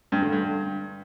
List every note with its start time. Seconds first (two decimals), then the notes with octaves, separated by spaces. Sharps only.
0.12 G2
0.22 D3
0.33 G2